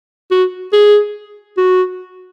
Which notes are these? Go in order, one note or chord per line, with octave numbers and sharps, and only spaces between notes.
F#4
G#4
F#4